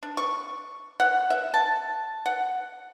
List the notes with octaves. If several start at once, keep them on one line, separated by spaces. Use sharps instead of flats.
D4
C#6
F#5
E5
A5
F#5